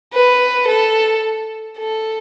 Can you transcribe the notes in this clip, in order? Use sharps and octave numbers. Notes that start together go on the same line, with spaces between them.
B4
A4
A4